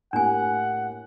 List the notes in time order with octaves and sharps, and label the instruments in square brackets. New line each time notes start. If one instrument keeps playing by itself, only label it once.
[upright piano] A2 A#3 G4 [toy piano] D4 G#5 [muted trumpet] F#5